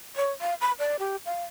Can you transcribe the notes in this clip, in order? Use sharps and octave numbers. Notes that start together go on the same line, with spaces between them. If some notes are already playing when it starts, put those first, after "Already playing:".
C#5
F5
B5
D5
G4
F5